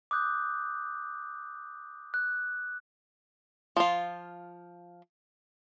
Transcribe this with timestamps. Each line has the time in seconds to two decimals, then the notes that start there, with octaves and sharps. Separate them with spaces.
0.11 D6 D#6 F#6 G6
2.14 F#6
3.76 F3 F4